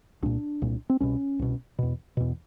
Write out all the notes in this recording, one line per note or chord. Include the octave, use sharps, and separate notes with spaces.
C2 A#2 D4
C2 A#2
C4
C2 B2 C#4
C2 B2
E2 B2
E2 B2